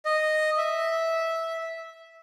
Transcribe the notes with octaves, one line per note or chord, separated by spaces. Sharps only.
D#5
E5